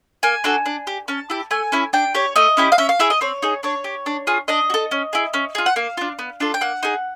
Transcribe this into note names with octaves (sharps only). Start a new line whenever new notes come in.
A#3 G#5
D4 F#4 A4
D4
G4
C#4 A5
E4 G4
A3 G#5
C#4 E4
D4 G5
G4 C#5
A3 D#5
C#4 E4 G4
F5
C#4 E5
F5
E4 G#4 E5
D#5
C4 C#5
D#4 G#4
D4 C#5
G4
D4
F4 G#4
D4 D#5
F#4
A4
C#4
E4 G#4
C#4
F4 G#4
F#5
A#3 F5
D4 F4
B3
D4 F4 A4
G5
A#3 F#5
D#4 G#4